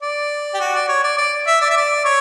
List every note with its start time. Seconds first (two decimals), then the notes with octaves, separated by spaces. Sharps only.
0.02 D5
0.54 G4
0.60 F#4
0.75 D5
0.89 C#5
1.04 D5
1.18 D5
1.47 E5
1.61 D5
1.71 E5
1.77 D5
2.05 C#5